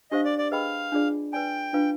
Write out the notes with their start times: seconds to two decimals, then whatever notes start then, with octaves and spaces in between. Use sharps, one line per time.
0.11 D4 G4 C5 D#5 F5
0.25 D5
0.38 D5
0.51 G#4 B4 D#5 F5 G5 B5
0.92 D4 F4 G#4 D5
1.33 B4 D5 G5 G#5
1.73 D4 F4 B4 F5